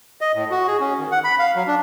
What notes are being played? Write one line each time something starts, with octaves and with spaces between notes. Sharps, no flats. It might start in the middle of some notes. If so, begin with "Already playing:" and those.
D#5
A2
F#4
G#4
C#4
D#3
F#5
B5
F5
F#3
D4